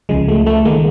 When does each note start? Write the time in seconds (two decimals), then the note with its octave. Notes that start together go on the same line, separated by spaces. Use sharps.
0.09 C#2 C#3 F3 G#3
0.28 A3
0.46 A3
0.65 D#3 G#3 A#3